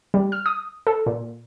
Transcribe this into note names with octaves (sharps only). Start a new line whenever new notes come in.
G3
F6
D#6
A4
A#2